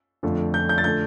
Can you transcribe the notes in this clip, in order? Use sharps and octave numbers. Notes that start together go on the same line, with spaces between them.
F2 D3 F3 A3
G6
G6
A6
D3 A3 G6